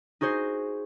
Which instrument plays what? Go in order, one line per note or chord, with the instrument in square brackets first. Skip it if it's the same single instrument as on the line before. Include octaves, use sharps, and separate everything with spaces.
[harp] D#4 F#4 G#4 C5